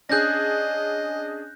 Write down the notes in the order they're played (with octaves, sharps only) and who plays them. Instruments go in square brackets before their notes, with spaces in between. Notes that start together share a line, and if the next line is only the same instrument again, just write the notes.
[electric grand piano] C#4 D4 G#4 [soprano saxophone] D#5 [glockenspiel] F#6 G6 A#6